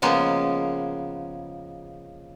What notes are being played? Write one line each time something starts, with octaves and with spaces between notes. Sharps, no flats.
C#3 F3 G#3 A#3 B3